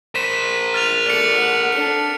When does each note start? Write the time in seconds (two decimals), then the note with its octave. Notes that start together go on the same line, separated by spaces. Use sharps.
0.15 A#4 C5 B6 D#7 E7
0.74 F6 A6 F7
1.06 A3 D5 A6 C#7
1.36 F#5
1.72 D4 A4 C#7